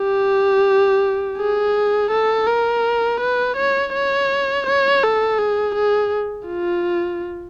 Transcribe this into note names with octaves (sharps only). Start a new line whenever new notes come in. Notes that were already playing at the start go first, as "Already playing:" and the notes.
Already playing: G4
G#4
A4
A#4
B4
C#5
C#5
C#5
A4
G#4
G#4
F4